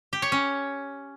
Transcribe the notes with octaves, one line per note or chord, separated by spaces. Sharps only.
G4
C#5
C#4